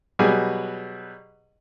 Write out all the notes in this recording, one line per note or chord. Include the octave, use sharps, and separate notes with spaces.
B2 F#3 G3 G#4